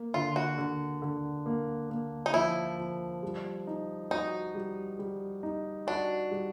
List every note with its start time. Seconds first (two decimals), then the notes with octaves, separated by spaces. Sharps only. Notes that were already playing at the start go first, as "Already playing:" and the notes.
Already playing: A#3
0.14 D3 F4
0.36 F#4
0.58 D3
1.02 D3
1.46 A#3
1.90 A#3
2.26 D#4
2.34 F3 E4
2.78 F3
3.23 G3
3.67 D#4
4.11 D#4 F#4
4.55 G3
4.99 G3
5.43 D#4
5.87 D4 F#4
6.32 G3